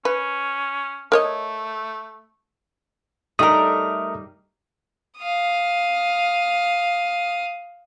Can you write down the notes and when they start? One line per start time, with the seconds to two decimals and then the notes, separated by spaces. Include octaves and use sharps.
0.05 C#4 B4
1.12 A3 A#4 C#5 D#5
3.39 G3 A3 D#4 G4 A#4 D#6
5.18 F5 D#6